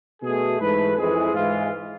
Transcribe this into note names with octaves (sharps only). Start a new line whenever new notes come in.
B2 A3 G#4
G#2 E3 A3 B4
F2 E3 G#3 G#4
G#2 E3 G#3 F4